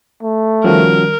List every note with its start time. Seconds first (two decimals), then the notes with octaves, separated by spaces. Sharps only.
0.23 A3
0.64 D#3 F3 G3 C#4 F#4 A#4